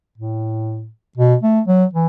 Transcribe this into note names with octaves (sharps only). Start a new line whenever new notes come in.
A2
B2
A3
F#3
E3